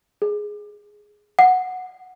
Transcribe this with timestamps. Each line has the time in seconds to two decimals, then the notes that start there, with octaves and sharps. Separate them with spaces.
0.22 G#4
1.39 F#5